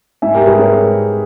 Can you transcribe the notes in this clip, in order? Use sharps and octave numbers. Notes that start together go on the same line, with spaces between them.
G#2 E5 G#5
G4 A#4
G3
G#4 B4
G#2 A#4 C#5